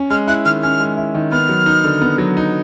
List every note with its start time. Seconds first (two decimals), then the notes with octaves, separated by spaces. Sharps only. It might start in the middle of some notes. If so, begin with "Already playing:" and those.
Already playing: C#4
0.10 G#3 F6
0.28 E4 F#6
0.45 D#3 F6
0.63 C#4 F6
0.80 G#3
0.97 E4
1.15 D#3
1.32 B3 F6
1.49 F#3
1.66 D#4
1.84 D3
2.02 B3
2.18 F#3
2.37 D#4